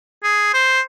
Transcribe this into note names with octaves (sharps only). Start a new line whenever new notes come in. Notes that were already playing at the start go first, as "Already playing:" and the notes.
G#4
C5